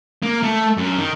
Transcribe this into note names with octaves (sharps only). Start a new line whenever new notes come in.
A#3
A3
F#2
D#3